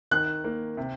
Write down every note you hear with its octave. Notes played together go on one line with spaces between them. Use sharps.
D#3 F#6
A#3
C3